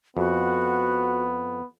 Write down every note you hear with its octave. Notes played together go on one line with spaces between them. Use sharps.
F2 B3 F#4